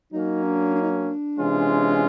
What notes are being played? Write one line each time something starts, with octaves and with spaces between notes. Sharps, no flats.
F#3 A#3 C#4 D#4
D4
D4
D#4
D4
C3 E3 G#3 C#4 F4